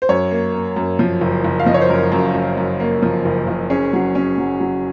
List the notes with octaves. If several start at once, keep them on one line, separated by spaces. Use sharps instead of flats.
C5
F#2 C#5
A#3
A#3
F#2
F3
F#1
F#1
F5
F3 D#5
C#5
C5
F#2 A#4
F#2
F#2
F#2
A#3
F3
F#1
F#1
C#4 G#4
F#3
C#4
F#3
F#3